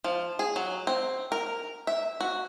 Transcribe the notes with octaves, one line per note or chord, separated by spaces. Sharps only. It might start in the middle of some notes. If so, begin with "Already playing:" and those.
F3
G#4
F#3
C4
A#4
E5
F#4